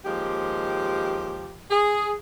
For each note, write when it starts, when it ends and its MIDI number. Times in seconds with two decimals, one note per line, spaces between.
0.04 1.54 39
0.04 1.54 53
0.04 1.54 56
0.04 1.54 67
1.70 2.12 68